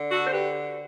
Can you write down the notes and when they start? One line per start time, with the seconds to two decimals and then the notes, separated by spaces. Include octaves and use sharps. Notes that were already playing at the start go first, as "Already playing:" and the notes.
Already playing: D3
0.10 F#4 A4
0.27 C5
0.33 G4 B4